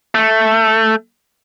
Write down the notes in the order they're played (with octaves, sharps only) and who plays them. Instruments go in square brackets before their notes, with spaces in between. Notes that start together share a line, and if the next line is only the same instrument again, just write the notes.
[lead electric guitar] A3